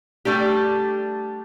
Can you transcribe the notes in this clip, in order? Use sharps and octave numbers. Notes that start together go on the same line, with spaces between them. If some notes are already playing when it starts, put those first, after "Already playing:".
G3 A3 D4 G4